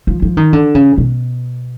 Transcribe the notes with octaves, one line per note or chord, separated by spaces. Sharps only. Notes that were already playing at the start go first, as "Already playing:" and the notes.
F3
F3
D#3
D3
C#3
B2